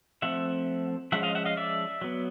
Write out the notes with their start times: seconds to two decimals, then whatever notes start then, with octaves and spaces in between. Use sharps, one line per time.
0.22 F3 A3 C4 E5 F#5
1.12 F3 G#3 C#4 E5 F#5
1.23 D#5 F5
1.35 E5 F#5
1.45 D#5 F5
1.57 D5 E5
2.02 F#3 B3